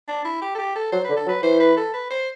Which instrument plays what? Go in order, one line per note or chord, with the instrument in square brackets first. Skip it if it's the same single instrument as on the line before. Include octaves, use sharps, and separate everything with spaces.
[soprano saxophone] D4
E4
G4
A4
G4
A4
[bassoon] F#3 [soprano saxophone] C5
[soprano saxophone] B4
[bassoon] D3
[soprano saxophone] A4
[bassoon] F#3
[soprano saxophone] B4
[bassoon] E3 [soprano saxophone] C5
[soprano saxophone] B4
A4
B4
C5